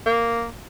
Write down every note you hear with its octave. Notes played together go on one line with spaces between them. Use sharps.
A#3